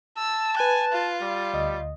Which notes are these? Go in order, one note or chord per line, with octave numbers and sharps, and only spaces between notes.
A5 E6
B4 G#5 F#6
F4
G3
D2 D#5